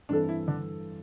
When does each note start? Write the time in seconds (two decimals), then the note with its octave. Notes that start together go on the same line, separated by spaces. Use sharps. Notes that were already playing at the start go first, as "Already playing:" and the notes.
0.09 G2 E3 C4 D4 A4
0.29 E4
0.48 D3